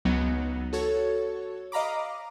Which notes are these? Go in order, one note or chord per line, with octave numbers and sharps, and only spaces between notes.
C#2 F#3 B3 D#4
F#4 A4 C#5
D#5 F5 A#5 B5 D6